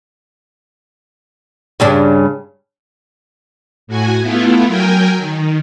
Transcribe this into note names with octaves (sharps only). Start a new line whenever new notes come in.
G2 C#3 D4
A2 F#4 G#5
A3 B3 E4 F4
F#3 A#4 G5 G#5
D#3